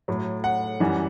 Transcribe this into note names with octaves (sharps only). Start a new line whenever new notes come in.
A2 F#3
F#5
F#2 E3 G3